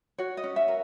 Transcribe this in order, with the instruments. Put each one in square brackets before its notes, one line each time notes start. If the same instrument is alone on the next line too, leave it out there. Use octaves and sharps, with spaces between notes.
[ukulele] F#4 C#5
D#5
C#4
E5
A#4